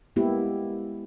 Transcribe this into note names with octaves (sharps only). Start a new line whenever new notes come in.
G#3 A#3 B3 E4 G4